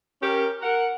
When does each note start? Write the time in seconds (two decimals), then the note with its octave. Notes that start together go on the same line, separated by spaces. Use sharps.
0.22 C#4 G4 A#4
0.61 A#4 F#5